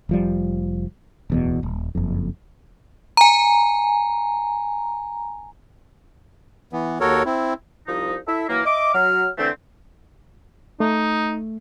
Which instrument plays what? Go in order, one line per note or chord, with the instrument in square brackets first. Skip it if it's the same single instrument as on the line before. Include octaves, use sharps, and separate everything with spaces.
[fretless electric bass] F1 F3 G3
D1 E2 B2
D#1
F#1 F2
[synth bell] G#5 A#5
[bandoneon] E3 B3
D#2 F#4 A4 A#4 C#5
C4 E4
[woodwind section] C2 F3 D#4
E4 A4 E5
E3 F#3 A#3
D#5 E5 D6
F#3 F6
D3 E3 A3 C4
[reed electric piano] A3 [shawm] D#4